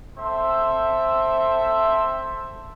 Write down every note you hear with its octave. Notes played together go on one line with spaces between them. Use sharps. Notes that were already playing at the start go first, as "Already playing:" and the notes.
C4 A4 C5 E5